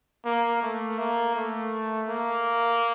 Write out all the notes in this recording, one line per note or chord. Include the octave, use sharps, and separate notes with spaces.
A#3
A3
A#3
A3
A#3